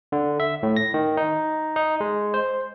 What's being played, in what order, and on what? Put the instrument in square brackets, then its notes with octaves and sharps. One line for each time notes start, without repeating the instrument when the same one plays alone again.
[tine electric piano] D3
E5
A2
A#6
D#3
D#4
D#4
G#3
C5